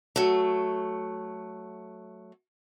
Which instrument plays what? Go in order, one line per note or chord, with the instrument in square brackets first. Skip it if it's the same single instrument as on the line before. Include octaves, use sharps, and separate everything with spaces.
[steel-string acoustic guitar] F#3 A3